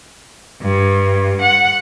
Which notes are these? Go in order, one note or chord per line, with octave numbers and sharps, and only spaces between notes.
G2
F#5